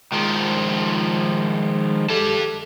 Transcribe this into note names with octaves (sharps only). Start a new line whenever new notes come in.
D#3 F3 G#3
G4 A4 A5